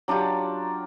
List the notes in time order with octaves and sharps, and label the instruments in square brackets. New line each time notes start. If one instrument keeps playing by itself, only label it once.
[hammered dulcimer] F#3 D4 F4 G4